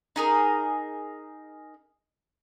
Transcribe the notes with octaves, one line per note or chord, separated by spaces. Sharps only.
D#4 G#4 A#4